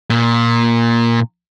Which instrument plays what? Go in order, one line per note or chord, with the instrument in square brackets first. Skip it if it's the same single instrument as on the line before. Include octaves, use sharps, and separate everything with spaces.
[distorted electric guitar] A#2